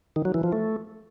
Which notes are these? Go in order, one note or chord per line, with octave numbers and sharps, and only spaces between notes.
D#3
F#3
E3
F3
A3